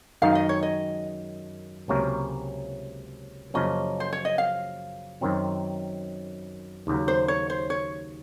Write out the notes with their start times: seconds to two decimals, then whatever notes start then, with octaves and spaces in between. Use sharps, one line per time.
0.22 F#2 D#3 G#3 D#4 F5
0.35 D#5
0.49 C#5
0.63 D#5
1.88 C#2 C3 F#3 A#3 C#4
3.54 F#2 C#3 F3 A#3 C#4 D#5
4.00 C5
4.13 C#5
4.25 D#5
4.38 F5
5.21 F#2 D#3 F#3 C4
6.87 D#2 C#3 F#3
7.08 C5
7.28 C#5
7.50 C5
7.70 C#5